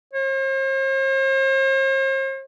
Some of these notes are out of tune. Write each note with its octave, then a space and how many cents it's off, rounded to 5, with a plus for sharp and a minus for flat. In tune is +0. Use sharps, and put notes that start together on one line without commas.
C5 +45